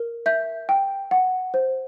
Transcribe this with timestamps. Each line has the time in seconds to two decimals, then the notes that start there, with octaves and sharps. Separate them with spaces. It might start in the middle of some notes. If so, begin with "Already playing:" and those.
Already playing: A#4
0.26 E5 G6
0.69 G5
1.11 F#5
1.54 C5